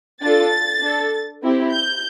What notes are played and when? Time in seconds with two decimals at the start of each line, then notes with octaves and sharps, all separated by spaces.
0.21 D4 F4 A4 A6
0.80 D4 A4
1.42 C4 E4 G4
1.71 G6